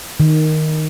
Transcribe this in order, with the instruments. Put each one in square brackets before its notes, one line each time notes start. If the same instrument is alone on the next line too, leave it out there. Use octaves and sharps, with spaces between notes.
[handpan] D#3